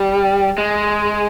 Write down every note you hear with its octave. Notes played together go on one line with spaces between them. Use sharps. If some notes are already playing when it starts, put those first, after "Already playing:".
Already playing: G3
G#3